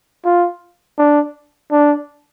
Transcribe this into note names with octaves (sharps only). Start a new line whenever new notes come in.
F4
D4
D4